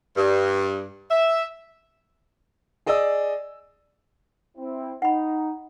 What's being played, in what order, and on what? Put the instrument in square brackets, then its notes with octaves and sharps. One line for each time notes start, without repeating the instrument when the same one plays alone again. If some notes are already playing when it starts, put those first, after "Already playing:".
[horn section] G2
E5
[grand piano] G#4 D5 D#5 D#6 E6
[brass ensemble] C4 E4
[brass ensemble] D#4 [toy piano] F#5 B5